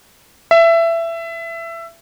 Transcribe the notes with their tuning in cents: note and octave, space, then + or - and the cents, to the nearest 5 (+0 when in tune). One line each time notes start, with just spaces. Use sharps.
E5 +20